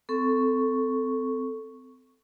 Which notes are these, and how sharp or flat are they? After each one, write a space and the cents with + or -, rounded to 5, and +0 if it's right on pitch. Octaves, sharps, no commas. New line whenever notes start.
C4 -30 A4 +0 C#6 +0